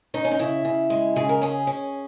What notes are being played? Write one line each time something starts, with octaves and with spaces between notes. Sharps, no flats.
C#4 D#4
C#4
D#4
C#3 E4
C#3
G#3
C#3 G#4
A#4
C#4 G#4
C#4